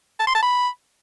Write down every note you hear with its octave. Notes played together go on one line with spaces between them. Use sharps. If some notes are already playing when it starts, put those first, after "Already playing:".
A5
C6
A5
B5